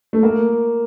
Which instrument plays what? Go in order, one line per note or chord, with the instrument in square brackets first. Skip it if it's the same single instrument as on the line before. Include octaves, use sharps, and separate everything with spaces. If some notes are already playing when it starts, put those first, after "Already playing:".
[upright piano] A3
A#3